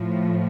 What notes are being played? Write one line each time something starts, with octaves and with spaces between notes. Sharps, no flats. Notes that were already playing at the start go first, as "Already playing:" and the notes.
Already playing: A2 F3